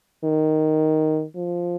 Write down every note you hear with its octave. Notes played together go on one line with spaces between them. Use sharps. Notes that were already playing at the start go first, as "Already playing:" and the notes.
D#3
F3